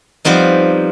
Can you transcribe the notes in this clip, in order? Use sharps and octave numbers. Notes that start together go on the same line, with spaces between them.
F3 G3 B3 C4 D#4